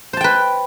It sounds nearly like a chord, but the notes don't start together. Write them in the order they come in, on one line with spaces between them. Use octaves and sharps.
C5 A5 G5 B4